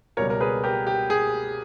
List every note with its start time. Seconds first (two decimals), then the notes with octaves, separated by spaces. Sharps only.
0.17 C#2 B2 G3 A#4 C#5
0.30 A#4
0.40 G#4 B4
0.64 G4 A#4
0.87 G4
1.10 G#4